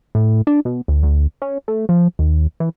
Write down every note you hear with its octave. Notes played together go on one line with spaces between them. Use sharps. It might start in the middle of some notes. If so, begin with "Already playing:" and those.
A2
D4
B2
D2
D2
C#4
A3
F3
D#2
E3